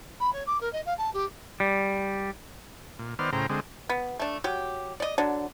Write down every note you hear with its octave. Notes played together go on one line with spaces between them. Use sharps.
B5
C#5
D6
A#4
D#5
F5
A5
G4
G3
A#2
D#3 B3 C5 D5 F6
A2 C#3 C5 G5 A#5
D3 G#3 C4
B3
A3 D4
F#3 G4
D5 D#5
D3 F#3 D4